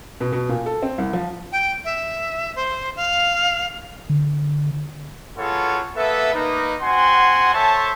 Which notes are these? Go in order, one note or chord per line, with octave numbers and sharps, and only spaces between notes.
B2
B2
A#2
A4
C4
C2
F3
G5
E5
C5
F5
D3
B3 F4 F#4 G#4 A4 C#5
A#3 B3 A4 B4 E5
A#3 D#4 B4
C4 F#4 F#5 G#5 C6
A4 C5 C#5 E5 A5